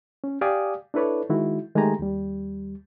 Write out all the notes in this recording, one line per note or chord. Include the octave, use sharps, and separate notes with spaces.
C#4
G4 D5 F5 G#5 D6 D#6
D4 E4 A4 B4 C#5 D5
D#3 G#3 E4 F#4
D#3 G#3 A3 G4 G#5 A#5
D#2 G3